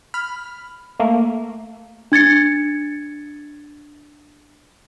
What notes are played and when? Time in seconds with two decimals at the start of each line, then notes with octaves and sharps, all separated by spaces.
0.14 B5 F6
1.00 A3 A#3
2.12 D4 G#6 A6 C#7